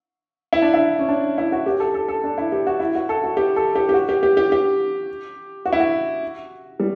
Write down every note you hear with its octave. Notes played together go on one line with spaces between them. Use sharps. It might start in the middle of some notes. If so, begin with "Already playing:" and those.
E4
D4
E4
C#4
D4
E4
F#4
G4
A4
A4
A4
D4
E4
G4
F#4
E4
F#4
A4
F#4
G4
A4
G4
G4
F#4
G4
G4
G4
G4
F#4
E4
F#4
G3